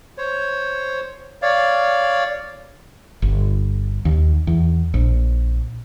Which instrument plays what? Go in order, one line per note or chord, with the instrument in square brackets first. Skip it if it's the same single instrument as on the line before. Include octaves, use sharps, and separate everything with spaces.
[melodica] C5 C#5
C#5 D5 F5
[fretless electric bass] G1
D#2
E2
A#1